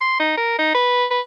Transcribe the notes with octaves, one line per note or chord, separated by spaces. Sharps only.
C6
D#4
A#4
D#4
B4
B4